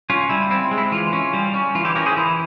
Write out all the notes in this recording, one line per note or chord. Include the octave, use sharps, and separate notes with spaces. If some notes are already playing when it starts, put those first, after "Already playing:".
C#4 F4
G3 E4
C4 E4
G#3
E4
E3 F4
C#4
G3
C#4
E3 F4
E4 G4
C#4 G4 A#4
G#4 C5
E3 E4